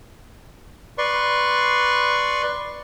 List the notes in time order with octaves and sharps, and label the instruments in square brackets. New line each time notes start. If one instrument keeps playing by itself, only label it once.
[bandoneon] B4 D5 C6 C#6